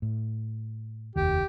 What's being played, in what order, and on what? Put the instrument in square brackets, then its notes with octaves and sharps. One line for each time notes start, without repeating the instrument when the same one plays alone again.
[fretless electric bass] A2
[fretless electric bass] F1 D#2 D#3 [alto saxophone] G4